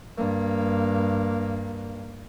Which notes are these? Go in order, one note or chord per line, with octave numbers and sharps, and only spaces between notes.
G2 A#3